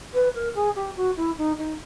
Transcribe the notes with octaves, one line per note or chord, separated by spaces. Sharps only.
B4
A#4
G#4
G4
F#4
E4
D#4
D#4